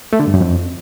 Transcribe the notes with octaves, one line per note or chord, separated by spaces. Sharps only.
A3
D3
G2
F#2
F2